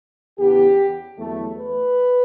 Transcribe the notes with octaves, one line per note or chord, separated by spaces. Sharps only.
E2 C#3 E3 B3 D4 G4
E2 D3 F#3 A3
B4